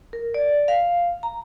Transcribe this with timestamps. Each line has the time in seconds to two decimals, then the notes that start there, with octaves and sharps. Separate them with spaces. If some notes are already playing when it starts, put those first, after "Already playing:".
0.13 A#4
0.34 D5
0.68 F5
1.23 A#5